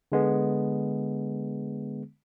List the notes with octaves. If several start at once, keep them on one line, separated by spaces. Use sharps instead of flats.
D3 G#3 B3